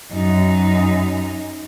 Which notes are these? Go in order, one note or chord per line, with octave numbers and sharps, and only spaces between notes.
F#2 D#4